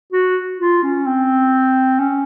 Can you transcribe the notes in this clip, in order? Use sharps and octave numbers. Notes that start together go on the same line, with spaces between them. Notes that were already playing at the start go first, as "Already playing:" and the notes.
F#4
F4
C#4
C4
C#4